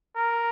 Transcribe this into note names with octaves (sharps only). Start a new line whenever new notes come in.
A#4